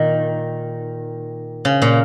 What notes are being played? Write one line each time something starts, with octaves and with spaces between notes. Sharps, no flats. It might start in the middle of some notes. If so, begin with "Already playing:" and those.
Already playing: A#2 D#3
C#3
A#2